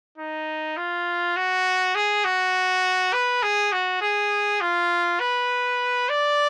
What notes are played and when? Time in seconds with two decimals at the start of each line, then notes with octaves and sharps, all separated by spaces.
0.18 D#4
0.77 F4
1.36 F#4
1.95 G#4
2.24 F#4
3.13 B4
3.42 G#4
3.72 F#4
4.02 G#4
4.61 F4
5.20 B4
6.09 D5